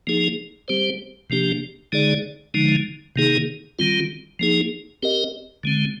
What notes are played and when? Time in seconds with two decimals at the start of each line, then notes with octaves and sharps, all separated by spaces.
0.07 F3 A#3 D#4 G#4
0.68 G3 C4 G4 C5
1.30 C3 F3 A#3 D4 G4
1.92 D3 G#3 D#4 G#4 D5
2.54 D3 F3 G#3 D#4
3.16 C3 D#3 A#3 D#4 G#4
3.79 D#3 G3 C4 F4
4.39 F3 A#3 D#4 G#4
5.03 C4 G4 A#4 D#5
5.63 D3 G#3 C4